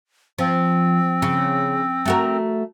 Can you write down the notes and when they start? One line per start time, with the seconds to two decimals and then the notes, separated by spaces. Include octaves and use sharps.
0.38 F3 C4
1.22 C#3
2.05 A3 F#4 A#4